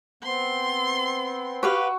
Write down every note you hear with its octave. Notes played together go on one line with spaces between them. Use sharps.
B3 C4 C6
F#4 G4 B4 F5 C#6 E6